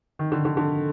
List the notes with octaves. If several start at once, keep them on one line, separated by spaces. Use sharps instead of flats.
D#3
D3
D3
D3